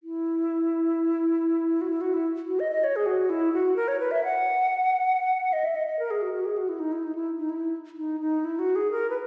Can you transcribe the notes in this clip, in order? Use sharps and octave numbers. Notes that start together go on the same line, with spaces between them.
E4
F#4
E4
F#4
E4
F#4
D#5
D#5
C#5
G#4
F#4
E4
F#4
A#4
C#5
B4
E5
F#5
D#5
E5
D#5
D#5
A#4
G#4
F#4
F#4
G#4
F#4
E4
D#4
E4
D#4
E4
D#4
E4
D#4
D#4
E4
F#4
G#4
A#4
B4